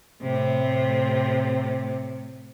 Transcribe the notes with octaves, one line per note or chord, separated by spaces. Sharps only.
A2 C3